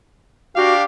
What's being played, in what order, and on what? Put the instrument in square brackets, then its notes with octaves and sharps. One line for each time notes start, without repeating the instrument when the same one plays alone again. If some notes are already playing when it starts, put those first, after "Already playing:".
[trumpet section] D4 F5 [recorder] F#4 [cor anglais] G4